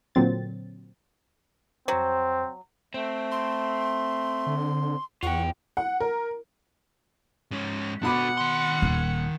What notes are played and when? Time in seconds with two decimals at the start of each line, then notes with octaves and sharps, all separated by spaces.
0.15 A#2 D3 F#3 C4 A6
1.88 F2 F#3 C4 C5
2.94 A3 C4
3.31 C6
4.46 D3
5.23 E2 F4 F#5 G5 C#6
5.77 F#5
6.00 A#4
7.51 G#2 C#4
8.03 B2 D4 F#4 F#5 B5 D6
8.37 D#3 C6
8.82 D#1